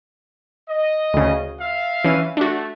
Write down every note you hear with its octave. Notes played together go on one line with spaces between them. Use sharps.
D#5
D2 C#3
F4 E5 F5
E3 C#4 D#7
A3 D4 F#4